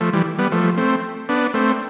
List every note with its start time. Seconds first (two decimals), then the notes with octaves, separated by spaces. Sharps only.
0.01 F3 A3
0.13 E3 G3
0.38 G3 B3
0.52 F3 A3
0.77 A3 C4
1.29 B3 D4
1.54 A3 C4